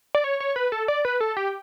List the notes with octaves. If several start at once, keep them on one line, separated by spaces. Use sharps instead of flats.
D5
C#5
C#5
B4
A4
D5
B4
A4
G4